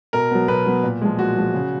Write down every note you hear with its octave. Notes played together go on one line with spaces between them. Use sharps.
B2 A#4
F#3 B3
B2 B4
F#3 B3
A#2
F3 G#3
A#2 F#4
F3 G#3
C#3